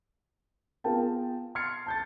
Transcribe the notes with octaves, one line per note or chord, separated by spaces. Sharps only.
B3 F4 G#4 A#4 G5 A5
C6 F6 G#6 A6 C7 C#7
A5 G6 A6